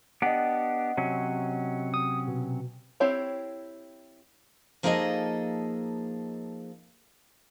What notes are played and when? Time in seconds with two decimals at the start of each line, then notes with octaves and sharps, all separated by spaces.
0.22 B3 D4 G4 D#5 F#5
0.97 C3 F#3 C#4
1.94 D#6
2.28 B2
3.00 C4 E4 G4 C5 C#5
4.83 F3 A#3 D#4 G#4 A4 D#5